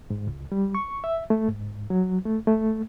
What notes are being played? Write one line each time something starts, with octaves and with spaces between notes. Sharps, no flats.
G#2
C#2
G3
C#6
E5
A3
G#2
F#3
A3
A3